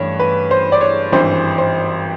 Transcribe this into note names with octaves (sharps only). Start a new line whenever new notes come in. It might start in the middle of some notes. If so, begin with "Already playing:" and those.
Already playing: G2 E3 A3 D4 C#5
B4
C5
D5
C#5
G#1 G2 E3 C5
C5